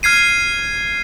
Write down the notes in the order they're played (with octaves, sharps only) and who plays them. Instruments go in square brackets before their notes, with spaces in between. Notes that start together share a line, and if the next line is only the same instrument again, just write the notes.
[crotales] F6 G#6 C7 D#7